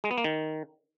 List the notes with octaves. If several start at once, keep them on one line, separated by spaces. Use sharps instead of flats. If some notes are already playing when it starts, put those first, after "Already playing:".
G#3
B3
A#3
D#3